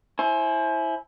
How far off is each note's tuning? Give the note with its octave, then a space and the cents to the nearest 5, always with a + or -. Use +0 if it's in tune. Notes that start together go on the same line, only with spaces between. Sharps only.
E4 +0 C5 +30 G#5 +30